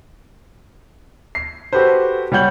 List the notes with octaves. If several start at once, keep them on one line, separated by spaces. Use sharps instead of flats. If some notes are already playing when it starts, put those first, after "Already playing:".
C7
F#4 G4 A4 B4 C5
G3 C#5 F#5 G6 F#7